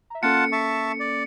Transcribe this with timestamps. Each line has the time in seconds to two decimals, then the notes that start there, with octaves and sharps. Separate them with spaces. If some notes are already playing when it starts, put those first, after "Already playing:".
0.10 E5 A#5
0.23 A#3 C#4 F4 A4 F#5 A5 C#7
0.52 E5 A5 C#6
1.00 D5